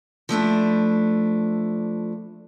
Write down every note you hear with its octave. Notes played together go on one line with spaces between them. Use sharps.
F3 A3 D4 E4